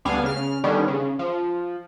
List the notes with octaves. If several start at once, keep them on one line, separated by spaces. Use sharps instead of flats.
D2 G3 B3 D4 F5 G#5
C#3 F6
D3 D#3 G3 B3 C#4
C#3
F3